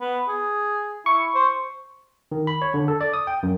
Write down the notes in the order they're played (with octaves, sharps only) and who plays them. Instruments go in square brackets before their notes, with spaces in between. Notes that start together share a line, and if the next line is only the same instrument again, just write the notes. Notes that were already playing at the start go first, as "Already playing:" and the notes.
[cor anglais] B3
G#4
[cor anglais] E4 [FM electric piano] C#6
[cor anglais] C5
[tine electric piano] D#3
B5
C#5
D3
A4
D5
D#6
G5
F#2